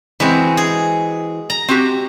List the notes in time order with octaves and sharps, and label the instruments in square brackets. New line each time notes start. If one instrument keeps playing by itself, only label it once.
[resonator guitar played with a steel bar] E3 C4 [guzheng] G#3 F#4
[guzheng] G#4
A#5
[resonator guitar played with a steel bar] C4 F#4 G4